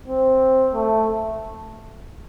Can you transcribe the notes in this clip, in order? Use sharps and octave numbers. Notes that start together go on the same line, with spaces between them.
C4
A3